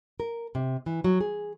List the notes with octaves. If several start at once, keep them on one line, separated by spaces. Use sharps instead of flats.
A#4
C3
E3
F#3
G#4